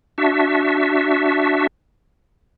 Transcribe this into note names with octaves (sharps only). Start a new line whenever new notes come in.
D4 F#4 E5